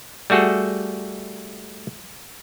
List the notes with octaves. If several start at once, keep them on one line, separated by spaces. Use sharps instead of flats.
G3 A3 F#4 G#4 A4